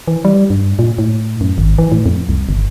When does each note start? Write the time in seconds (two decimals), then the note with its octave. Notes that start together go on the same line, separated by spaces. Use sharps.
0.08 E3
0.25 G3
0.50 G2
0.79 A#2
0.98 A2
1.41 F#2
1.58 G#1
1.78 E3
1.92 A2
2.06 F2
2.29 C2
2.49 G1